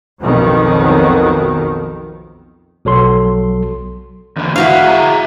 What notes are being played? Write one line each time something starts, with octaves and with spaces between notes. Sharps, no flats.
B1 F2 B2 D#3
B1 F#3 A4 C6
E2 D3
G#2 E4 F#4 E5 F5
G#4 E5 A#5